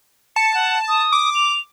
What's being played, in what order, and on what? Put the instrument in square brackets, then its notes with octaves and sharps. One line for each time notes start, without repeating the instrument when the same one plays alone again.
[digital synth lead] A5 [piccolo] C#7
[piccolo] F#5
D#6
[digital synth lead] D6
[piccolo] F7